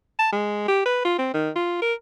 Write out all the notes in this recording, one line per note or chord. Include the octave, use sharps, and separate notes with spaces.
A5
G#3
G4
B4
F4
C4
D#3
F4
A#4